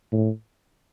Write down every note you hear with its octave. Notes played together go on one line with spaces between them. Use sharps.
A2